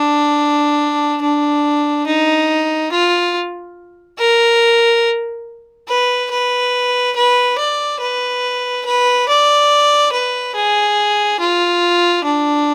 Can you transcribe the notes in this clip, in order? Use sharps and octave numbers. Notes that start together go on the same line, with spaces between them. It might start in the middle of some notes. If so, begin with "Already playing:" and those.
Already playing: D4
D4
D#4
F4
A#4
B4
B4
B4
D5
B4
B4
D5
B4
G#4
F4
D4